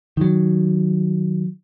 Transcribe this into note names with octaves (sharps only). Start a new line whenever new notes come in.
D#3 F#3